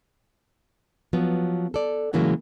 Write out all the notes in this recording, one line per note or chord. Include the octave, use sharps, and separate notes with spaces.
F3 F#3 B3
A4 D5
A2 C#3 E3 F#3 G#3 A#3